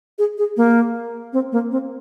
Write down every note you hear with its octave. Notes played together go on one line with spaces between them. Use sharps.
G#4
G#4
A#3
C4
A#3
C4